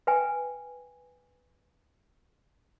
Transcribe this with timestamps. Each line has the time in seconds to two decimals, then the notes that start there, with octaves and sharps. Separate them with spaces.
0.07 B4 E5 G5 G#5